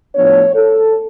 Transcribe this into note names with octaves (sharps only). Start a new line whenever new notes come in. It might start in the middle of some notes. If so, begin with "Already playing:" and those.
A2 F3 B3 D4 C#5
A4